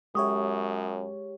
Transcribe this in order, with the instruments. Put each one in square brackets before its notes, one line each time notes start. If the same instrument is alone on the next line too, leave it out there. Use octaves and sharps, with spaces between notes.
[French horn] F#2 [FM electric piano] G#3 G4 C#5 [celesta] E5 C#6 D#6